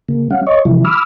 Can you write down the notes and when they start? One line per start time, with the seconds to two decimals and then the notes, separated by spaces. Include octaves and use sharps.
0.09 C#3 A#3
0.31 G3 C#4 F5 F#5
0.47 C#5 D#5 C#6
0.65 C3 E3 F3 G3 E4
0.84 B5 D6 E6 F6